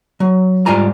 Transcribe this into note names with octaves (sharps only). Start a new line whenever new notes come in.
F#3
G#2 G3 F4 G#5 A#5